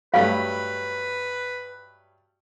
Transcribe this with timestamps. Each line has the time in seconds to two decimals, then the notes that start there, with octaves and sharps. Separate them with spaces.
0.14 G2 F#3 A3 B4 F5